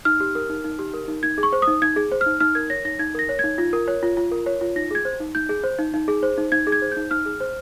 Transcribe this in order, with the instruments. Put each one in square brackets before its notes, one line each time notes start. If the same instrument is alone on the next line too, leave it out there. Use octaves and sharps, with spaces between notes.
[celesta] D#4 F6
G4
A#4
D#4
D#4
G4
A#4
D#4
D#4 G#6
G#4
C#6
C5
D#6
D#4
D#4 G#6
G#4
C5
F6
D#4
D#4 F6
A#4 G#6
C#5 A#6
D#4 A#6
D#4 G#6
A#4 A#6
C#5
D#4 G#6
F4
A#4
C#5
F4
F4
A#4
C#5
F4
D#4 A#6
G#4 G#6
C5
D#4
D#4 G6
G#4
C5
D#4
D#4
G#4
C5
D#4
D#4 G#6
G#4
G#6
C5
D#4 G6
D#4 F6
G#4
C5